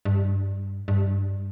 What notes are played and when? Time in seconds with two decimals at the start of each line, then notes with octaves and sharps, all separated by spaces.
0.05 G2
0.88 G2